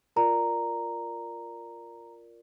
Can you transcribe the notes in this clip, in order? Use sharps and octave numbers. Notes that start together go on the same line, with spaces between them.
F4 A#4 D5 A#5